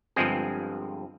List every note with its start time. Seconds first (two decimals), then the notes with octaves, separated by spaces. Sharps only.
0.16 G1 G2 F3 G#3 C4 G#4